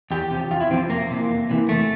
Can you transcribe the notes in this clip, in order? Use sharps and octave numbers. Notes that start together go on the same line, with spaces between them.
E2 G4
C3 F3
E2 F4
E4
C3 F3 C4
F2 A#3
C3 E3
F2
C3 E3
E2 A3